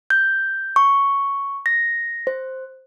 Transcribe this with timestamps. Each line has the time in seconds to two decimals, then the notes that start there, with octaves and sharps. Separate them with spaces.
0.10 G6
0.76 C#6
1.66 A#6
2.27 C5